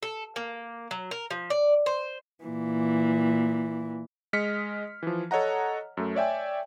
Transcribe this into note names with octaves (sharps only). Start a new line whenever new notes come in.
A4
A#3
F#3
A#4
F3
D5
C5
A#2 E3
G#3 D#5 F6 B6 C#7
E3 F3
A4 C#5 D#5 F#5 A#5
F#2 A3
C#5 D5 E5 G5 G#5